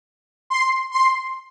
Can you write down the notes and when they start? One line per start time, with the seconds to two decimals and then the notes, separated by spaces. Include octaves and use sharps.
0.50 C6
0.92 C6